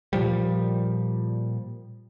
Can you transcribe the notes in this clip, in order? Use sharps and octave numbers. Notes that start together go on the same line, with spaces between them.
A#2 F3 G3